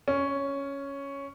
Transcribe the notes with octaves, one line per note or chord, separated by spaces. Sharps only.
C#4